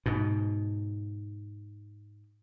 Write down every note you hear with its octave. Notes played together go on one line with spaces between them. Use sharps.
G#2 B2